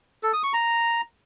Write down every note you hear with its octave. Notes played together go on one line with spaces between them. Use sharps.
A4
D#6
C#6
A#5